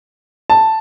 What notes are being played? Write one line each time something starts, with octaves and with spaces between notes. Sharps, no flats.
A5